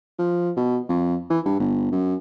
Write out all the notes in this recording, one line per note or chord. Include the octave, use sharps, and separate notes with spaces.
F3
B2
F2
E3
G2
G1
F#2